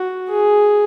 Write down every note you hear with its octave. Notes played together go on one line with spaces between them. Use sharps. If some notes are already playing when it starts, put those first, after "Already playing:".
Already playing: F#4
G#4